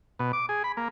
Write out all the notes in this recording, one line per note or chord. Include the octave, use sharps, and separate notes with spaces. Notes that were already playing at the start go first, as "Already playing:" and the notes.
B2
D6
G#4
B5
A#3